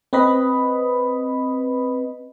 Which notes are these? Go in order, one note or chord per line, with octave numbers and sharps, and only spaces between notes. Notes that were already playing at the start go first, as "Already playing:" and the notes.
C4 B4 D#5 B5